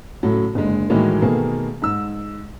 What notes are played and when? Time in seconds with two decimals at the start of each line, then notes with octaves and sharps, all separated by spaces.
0.23 A2 C#3 F#3 A3
0.55 F#1 D3 G#3
0.90 A2 D#3 E3 F#3 G#3 A#3
1.22 B2 D#3 A3 A#3 G#4
1.82 G#2 E6